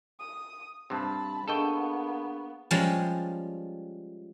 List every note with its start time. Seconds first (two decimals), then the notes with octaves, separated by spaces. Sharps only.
0.19 D#6
0.90 G2 C3 A5 B5
1.48 A#3 B3 D4 G#4 A4 D#5 G5 C#6
2.71 F3 G3 G#3 C#4